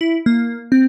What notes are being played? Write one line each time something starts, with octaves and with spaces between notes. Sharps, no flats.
E4
A#3
C4